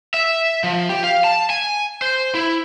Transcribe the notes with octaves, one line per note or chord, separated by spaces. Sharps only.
E5
F3
G4
F5
A5
G#5
C5
E4